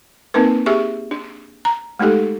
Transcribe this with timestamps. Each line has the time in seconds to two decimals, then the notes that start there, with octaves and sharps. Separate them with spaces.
0.34 A#3 C4 D#4 A#4 B4
0.66 G4 G#4 E5 C#6
1.11 D4
1.65 A#5
1.99 G#3 A3 D#4 G4 A4